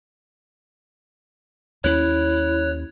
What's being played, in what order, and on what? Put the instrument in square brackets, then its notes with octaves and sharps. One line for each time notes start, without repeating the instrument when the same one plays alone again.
[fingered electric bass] D#2 A#3 C#4 [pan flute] E4 [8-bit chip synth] C#5 F#6